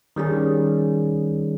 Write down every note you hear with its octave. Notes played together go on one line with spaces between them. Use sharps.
D#3 G3 C#4 G#4